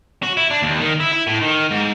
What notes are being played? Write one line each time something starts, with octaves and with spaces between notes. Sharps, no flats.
F#4
E4
D4
D#2
D#3
E4
E4
A2
D#3
G#2